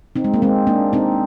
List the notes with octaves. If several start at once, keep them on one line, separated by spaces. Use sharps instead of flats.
C4 D#4
G#3
A#3
G#3 C4
A#3 D4
C4 D#4